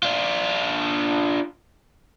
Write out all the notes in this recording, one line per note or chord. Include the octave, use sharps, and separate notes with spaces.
D4 F4